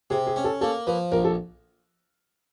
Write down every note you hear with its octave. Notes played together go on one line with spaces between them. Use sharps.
C3 G#4
G#4
C#4
A4
A#3 A4
F3 B4
A#1 A#4
A4